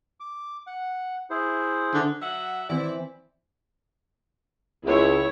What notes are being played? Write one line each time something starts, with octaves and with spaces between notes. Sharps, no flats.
D6
F#5
E4 G#4 C5
D3
F#3 E5 F#5
E3 C4 E4 D5
C#2 E4 C#5